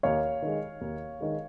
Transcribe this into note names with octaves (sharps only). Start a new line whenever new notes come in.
D#2 C#5 F5
D#3 G#3
D#2
D#3 G#3